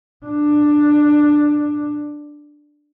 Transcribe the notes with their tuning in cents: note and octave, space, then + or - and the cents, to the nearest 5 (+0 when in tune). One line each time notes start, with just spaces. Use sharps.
D4 +10